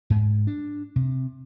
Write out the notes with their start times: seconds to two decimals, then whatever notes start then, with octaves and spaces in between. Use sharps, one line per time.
0.10 G#2
0.47 D4
0.96 C3